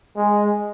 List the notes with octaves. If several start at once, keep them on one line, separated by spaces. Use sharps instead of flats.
G#3